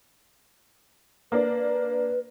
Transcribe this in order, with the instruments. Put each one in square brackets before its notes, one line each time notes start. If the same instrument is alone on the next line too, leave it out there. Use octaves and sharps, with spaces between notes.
[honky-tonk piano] A#3 D4 [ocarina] B4